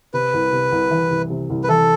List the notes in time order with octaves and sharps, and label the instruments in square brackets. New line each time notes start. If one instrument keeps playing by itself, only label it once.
[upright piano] C3 [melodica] B4
[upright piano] C2
C3
C2
E3
C2
C3
C2
[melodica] B4
[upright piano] E3 [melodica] A4